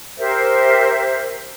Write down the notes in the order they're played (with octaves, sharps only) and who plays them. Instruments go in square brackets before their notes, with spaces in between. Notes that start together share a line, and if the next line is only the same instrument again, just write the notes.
[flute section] G4 A#4 C5 E5